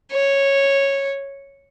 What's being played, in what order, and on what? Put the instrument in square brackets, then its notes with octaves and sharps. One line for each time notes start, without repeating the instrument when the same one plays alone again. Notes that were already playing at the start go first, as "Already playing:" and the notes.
[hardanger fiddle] C#5